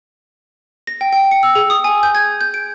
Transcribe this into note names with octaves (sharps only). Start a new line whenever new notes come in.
A#6
G5
G5
C#7
E6
G#4
D#6
G#5
G6
G#6
G6
D7